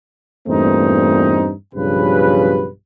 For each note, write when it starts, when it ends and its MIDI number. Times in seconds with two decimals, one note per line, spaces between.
0.48 1.53 40
0.48 1.53 43
0.48 1.53 46
0.48 1.53 57
0.48 1.53 60
0.48 1.53 63
1.75 2.69 35
1.75 2.69 43
1.75 2.69 49
1.75 2.69 53
1.75 2.69 67
1.75 2.69 71